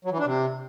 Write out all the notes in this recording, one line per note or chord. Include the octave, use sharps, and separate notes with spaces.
F#3
E3
D4
C3